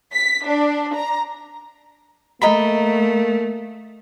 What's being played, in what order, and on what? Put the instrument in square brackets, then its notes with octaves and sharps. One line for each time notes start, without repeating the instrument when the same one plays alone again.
[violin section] B6
D4
A#5
[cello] A3 [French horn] A#3 [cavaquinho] D#5 A#5 B5